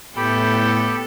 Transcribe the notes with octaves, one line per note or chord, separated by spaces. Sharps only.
A2 B3 G4 A4 G5 B5